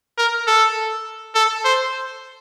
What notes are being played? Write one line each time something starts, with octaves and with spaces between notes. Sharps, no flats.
A#4
A4
A4
C5